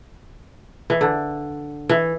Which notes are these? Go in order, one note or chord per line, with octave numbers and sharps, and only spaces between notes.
E3
D3
E3